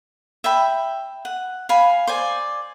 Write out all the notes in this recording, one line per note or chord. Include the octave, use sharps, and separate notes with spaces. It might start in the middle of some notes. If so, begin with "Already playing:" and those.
E5 G5 B5
F#5
F5 G#5 B5
C5 D5 G#5